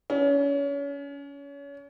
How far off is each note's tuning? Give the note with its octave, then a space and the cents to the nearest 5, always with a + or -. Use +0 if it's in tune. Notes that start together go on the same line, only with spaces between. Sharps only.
C#4 +30